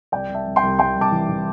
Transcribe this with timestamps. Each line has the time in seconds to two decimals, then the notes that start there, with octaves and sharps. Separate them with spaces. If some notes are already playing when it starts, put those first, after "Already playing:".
0.12 C2 D5 G5
0.29 C2
0.34 E5 A5
0.46 C2
0.56 G5 C6
0.63 C2
0.79 C2 G5 C6
0.95 C2
1.01 A5 D6
1.12 E3
1.29 E3